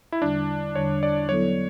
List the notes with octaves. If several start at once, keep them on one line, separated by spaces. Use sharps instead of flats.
E4
E2 D3 G3 D4
E2 D3 G3 C#5
D5
F#3 B3 E4 A4 C#5